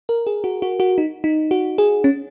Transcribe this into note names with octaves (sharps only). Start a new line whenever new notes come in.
A#4
G#4
F#4
F#4
F#4
D#4
D#4
F#4
G#4
C#4